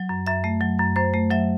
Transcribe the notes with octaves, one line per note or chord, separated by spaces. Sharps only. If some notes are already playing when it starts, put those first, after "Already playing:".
Already playing: F#3
F#2
F#2 E5
A3
F#3
F#2
F#2 C5
A3
F#3 E5